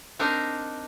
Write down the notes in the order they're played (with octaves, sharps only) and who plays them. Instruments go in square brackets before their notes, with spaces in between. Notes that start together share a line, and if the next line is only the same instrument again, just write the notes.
[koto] C4 D4 D#4 A#4